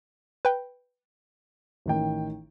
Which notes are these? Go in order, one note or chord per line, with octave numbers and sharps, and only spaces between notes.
B4 G5
A1 D#3 G5